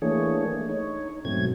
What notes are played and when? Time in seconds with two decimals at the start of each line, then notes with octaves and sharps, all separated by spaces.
0.02 E3 A3 A#3 D4 G#4 C#5
0.69 D#4 C#5
1.25 G#2 B2 F#3 A3 C4 G#6